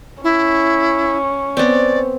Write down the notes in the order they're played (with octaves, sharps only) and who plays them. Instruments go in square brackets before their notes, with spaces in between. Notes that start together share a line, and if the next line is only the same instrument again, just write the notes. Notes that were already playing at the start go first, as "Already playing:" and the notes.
[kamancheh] C#4 [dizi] E4
[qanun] B3 C4 [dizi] D5